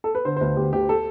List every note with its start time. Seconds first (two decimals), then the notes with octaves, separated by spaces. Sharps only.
0.04 A4
0.15 B4
0.25 D3 C5
0.37 C5
0.41 D2 B4
0.57 D2 G4
0.73 D2 G4
0.89 A4